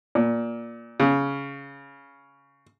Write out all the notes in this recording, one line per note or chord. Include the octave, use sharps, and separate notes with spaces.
A#2
C#3